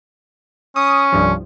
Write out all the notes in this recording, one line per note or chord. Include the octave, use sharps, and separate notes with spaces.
C#4 D#6
C2 G2 F3